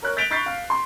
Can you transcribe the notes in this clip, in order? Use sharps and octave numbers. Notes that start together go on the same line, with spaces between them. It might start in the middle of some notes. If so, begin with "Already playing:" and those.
A#4 C#5 F#6
G6 A6 B6 D7 F7 G7
B5 C#6 G6 A6 B6 C7
F5
C6